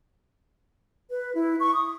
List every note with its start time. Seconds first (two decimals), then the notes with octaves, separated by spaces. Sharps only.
1.10 B4
1.35 E4
1.59 C#6
1.74 D#6